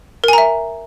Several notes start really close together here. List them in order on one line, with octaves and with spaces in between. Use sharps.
A#4 G#5 A#5 E5